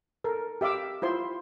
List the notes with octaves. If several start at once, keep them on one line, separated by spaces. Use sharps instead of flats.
A4 A#4
G4 E5 F5 D6 E6
E4 F4 C5 C6